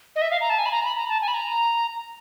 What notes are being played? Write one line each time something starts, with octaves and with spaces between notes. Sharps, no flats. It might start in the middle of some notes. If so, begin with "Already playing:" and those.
D#5
E5
F5
A#5
A5
G#5
B5
A#5
B5
A#5
A5
G#5
B5
A#5